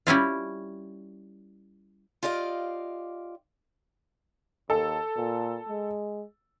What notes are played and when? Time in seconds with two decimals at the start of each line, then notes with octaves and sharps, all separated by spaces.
0.07 G3 C#4 E4 F4
2.23 F4 G4 D5 D#5 F5
4.70 D#2 A4
5.17 A#2
5.68 G#3